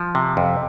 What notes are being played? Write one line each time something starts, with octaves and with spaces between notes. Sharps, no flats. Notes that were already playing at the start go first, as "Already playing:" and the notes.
Already playing: F3
C3
F2